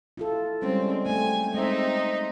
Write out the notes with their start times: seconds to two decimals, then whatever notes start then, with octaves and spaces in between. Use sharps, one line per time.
0.17 E4 F4 A4
0.62 G3 G#3 C4 C#4
1.06 A3 C4 G#5
1.54 G#3 C4 D#4 E5